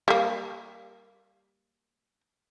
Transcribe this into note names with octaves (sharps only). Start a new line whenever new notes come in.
G3 A#3